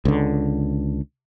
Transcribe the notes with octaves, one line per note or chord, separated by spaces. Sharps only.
C#2 D3